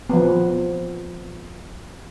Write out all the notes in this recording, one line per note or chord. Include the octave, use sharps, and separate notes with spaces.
F3 B3